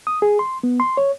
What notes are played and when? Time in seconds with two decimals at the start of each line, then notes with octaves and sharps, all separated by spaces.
0.07 D#6
0.22 G#4
0.39 C6
0.63 B3
0.80 C6
0.97 C#5